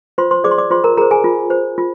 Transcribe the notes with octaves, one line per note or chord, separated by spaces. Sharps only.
F4 C5 C6
C5 C6
G#4 C5 D5 D6
C6
D5 D6
F4 C5 C6
A#4 A#5
G#4 A#4 C5 A#5
G#4 G#5
F4
C5
F4